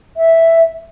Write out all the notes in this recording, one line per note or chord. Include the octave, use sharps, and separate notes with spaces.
E5